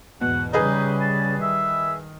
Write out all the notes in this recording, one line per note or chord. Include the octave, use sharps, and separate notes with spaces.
E2 G#2 B2 F#5
C#3 G3 D#4 G#4 B4 D#5
A5
D#3 E5